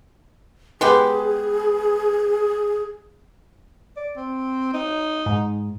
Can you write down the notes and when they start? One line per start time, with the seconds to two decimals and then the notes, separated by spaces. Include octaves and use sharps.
0.81 G#3 B3 G4 G#4 B4
3.96 D5
4.16 C4
4.73 D#4
5.26 G#2